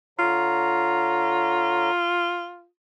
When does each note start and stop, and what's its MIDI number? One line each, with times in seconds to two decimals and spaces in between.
0.19 1.90 50
0.19 2.66 65
0.19 1.90 73
0.19 1.90 82